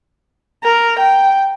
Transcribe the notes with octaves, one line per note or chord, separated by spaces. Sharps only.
A#4
G5